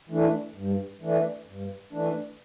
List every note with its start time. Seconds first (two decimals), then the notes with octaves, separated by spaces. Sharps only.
0.09 E3 A3 D4
0.56 G2
1.02 E3 A3 D4
1.47 G2
1.93 E3 A3 D4